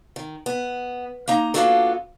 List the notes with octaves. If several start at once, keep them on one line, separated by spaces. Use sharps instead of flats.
D#3
B3
A#3 D#4 A#5
A#3 B3 D4 F4 F#4 A4